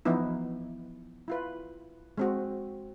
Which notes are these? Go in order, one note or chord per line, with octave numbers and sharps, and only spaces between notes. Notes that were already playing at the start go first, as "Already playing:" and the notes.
E3 F3 B3 D#4 E4
E4 F4 B4
G#3 C4 F#4